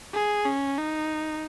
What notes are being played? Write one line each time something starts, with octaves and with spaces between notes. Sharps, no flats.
G#4
C#4
D#4